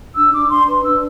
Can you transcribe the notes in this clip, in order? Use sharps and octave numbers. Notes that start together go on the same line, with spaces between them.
D4 E6
D4 D6
D4 C6
B4 C6
D4 E6